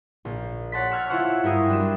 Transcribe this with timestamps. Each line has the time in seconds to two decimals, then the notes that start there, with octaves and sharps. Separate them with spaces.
0.25 A#1
0.72 C#5 F#5 A5 C6 B6
0.91 C#6 E6 F6 G#6
1.09 E4 F4 C5 F#5 C#6
1.43 G2 E4 G4 A#4 D#6 C7
1.69 G3 D4 F#4 C6 E7